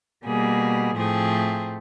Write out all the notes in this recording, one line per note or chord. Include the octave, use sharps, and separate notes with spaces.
B2 G3 A#3 G#4
A2 F3 A3 C4 G#4